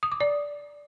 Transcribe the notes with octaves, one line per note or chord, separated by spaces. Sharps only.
D#6
D6
D5